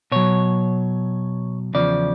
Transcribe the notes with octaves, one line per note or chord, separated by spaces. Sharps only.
B2 F#3 C#5
E2 C#3 F3 D5